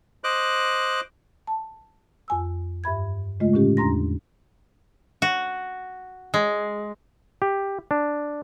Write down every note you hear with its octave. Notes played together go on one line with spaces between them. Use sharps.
C5 D#5 D6 F#6
A5
F2 G#5 E6
G2 E5 B5 G#6
C#3 G#3 A3 F4 D#5
A2 D3 C#4 G4
E2 D4 A#5 C6 A#6
F#4
G#3
G4
D4